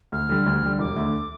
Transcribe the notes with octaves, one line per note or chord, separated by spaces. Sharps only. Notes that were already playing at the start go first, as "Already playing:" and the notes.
D2 F6
D3 G3
D2
D3 G3
E1 D6
D2 D3 A3